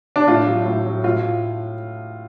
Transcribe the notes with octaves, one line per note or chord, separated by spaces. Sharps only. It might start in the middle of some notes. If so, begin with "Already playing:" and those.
D4
A2 F4
F#3
A2
F#3
A2 F4